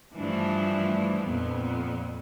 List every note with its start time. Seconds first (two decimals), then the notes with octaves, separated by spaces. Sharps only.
0.16 G2 E3 F3 A3 D4
1.26 F2 A#2 B3